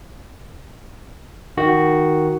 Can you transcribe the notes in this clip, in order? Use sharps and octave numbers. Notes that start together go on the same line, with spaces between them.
D#3 F#4